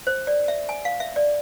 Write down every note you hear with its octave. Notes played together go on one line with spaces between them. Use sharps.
C5
D5
E5
G#5
F5
E5
D5